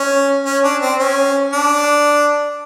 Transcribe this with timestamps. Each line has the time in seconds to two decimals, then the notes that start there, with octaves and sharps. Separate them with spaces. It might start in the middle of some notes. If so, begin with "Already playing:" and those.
Already playing: C#4
0.46 C#4
0.64 D4
0.82 C4
1.00 C#4
1.53 D4